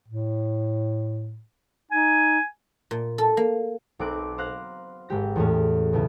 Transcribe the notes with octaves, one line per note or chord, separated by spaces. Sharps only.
A2
D#4 G#5
A#2
A4
A#3
B1 B2 C4 D6 F#6
C5 F5 F#6 A#6
G#1 G#3 G4 A#6
E2 A2 C#4
C#2 B2 B3 E4